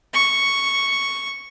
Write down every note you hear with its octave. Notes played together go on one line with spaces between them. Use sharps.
C#6